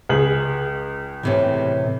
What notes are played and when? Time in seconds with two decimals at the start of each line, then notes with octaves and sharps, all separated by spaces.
0.09 C#2 G#4 F#7
1.23 A2 C3 E3